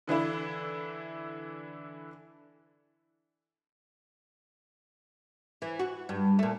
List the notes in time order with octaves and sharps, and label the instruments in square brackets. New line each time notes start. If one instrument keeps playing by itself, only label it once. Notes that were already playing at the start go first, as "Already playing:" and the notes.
[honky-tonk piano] D3 E3 D4 E4
[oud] E3
F#4
G2
A#2 A3